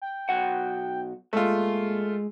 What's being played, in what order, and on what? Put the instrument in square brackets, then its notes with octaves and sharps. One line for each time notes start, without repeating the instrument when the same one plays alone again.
[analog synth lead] G5
[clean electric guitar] B1 F#4 F#5
[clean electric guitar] A#2 [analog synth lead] G#3 [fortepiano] A3 F4